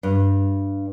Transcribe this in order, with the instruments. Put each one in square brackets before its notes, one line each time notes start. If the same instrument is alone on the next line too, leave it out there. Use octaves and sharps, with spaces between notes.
[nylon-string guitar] G2